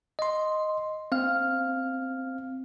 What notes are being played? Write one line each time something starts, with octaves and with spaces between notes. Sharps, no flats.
D#5 C6
C4 F5 F6